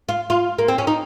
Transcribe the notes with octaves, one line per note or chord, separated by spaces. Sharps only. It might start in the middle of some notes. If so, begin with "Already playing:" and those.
F4
F4
A#3
C4
C#4
D#4